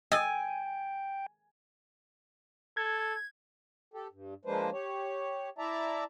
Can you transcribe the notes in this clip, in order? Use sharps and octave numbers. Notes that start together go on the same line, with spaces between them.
D#5 G5 G#5 E6 A6
A4 G#6
G4 A4
G2
F3 G#3 A#3 D4 B4 C5
G4 C#5
E4 D5 E5 A5 A#5